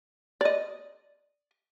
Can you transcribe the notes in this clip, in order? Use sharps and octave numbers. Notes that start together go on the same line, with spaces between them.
D5 D#5